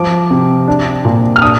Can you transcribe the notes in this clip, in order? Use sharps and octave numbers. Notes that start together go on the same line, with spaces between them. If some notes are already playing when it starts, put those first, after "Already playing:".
Already playing: F3 D6
C3
D4
A#2
F6
D4 D#6